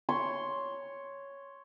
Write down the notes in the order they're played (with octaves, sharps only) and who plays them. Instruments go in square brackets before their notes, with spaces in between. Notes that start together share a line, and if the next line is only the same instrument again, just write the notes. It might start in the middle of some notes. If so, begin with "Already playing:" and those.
[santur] C#5 C6